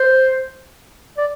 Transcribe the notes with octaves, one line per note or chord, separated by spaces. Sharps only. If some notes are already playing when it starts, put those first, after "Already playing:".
Already playing: C5
D5